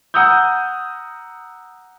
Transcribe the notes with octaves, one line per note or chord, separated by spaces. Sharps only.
F#5 A#5 D#6 E6 G6